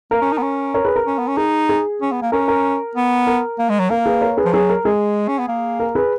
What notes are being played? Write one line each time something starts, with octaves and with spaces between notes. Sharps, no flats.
A#3 A#4
C#4
D#4
B3
C#4
A#4 C#5
G#4 B4
A#4
C#4
B3
C#4
D#4 G#4
G#4
C#4
B3
A#3
C#4 A#4
A#4
B3
A#4
A#3
G#3
F#3
A#3 A#4
G#4 B4
A#4 C#5
G#4 B4
F3
F#3 G#4
A#4
G#3 G#4
C#4
B3
A#3
A#4
G#4 B4